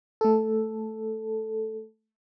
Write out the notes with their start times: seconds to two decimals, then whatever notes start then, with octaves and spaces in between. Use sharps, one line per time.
0.21 A3 A4